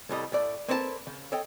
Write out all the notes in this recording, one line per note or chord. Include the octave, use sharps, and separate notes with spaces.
C2 A2 G3 D#5
A2 A3 D5
A#3 C4 A4 B4 C#5 A5
C#3
A4 C#5 D#5 G5